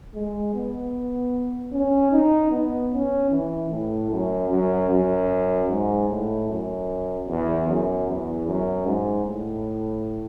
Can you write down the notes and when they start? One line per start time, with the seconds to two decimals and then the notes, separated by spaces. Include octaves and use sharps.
0.14 G#3
0.54 B3
1.72 C#4
2.12 D#4
2.51 B3
2.92 C#4
3.31 E3
3.70 A2
4.10 F#2
4.50 F#2
4.90 F#2
5.69 G#2
6.09 A2
6.48 F#2
7.28 E2
7.67 F#2
8.07 E2
8.47 F#2
8.86 G#2
9.26 A2